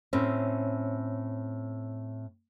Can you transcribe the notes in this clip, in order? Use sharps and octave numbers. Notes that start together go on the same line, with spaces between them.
A2 C4 C#4